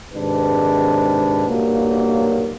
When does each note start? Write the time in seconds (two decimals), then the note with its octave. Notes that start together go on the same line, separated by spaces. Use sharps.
0.14 G#1 G#2 C3 D#3 D4 B4
1.47 B1 G2 A#2 F#3 A#3